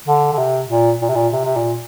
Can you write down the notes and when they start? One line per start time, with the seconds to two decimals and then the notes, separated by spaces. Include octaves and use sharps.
0.08 D3
0.33 D3
0.38 C3
0.70 A#2
1.02 A#2
1.09 C3
1.16 A#2
1.33 C3
1.46 C3
1.56 A#2